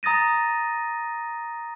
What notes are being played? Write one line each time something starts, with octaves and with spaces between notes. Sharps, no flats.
A#5 D#6 A6 A#6 D#7